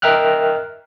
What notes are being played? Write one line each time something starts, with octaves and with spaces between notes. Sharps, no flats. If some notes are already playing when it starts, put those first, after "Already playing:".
A#4 D#5 E5 G5 F6 F#6